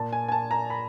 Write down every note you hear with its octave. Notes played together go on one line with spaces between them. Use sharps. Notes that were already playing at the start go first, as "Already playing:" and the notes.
Already playing: A#2 A5
G#5
G#5
A5
A#5
B5